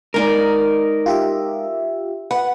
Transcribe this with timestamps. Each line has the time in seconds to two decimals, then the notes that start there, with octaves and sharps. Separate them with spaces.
0.14 G#3 D#4 A#4 D5
1.06 F4 G4 E5
2.31 B4 F#5